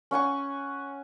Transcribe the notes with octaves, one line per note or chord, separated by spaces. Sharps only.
C#4 F#5 G#5 C#6